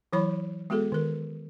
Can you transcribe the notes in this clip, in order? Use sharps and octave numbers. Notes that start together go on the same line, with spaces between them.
E3 F#3 E4 C#5 B5
G#3 B3 F#4 G#4 A4
D#3 A#4